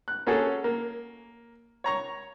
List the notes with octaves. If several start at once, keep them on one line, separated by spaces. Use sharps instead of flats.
F#6
A#3 C#4 F#4 G#4 A4
A#3
C#5 A#5 C#6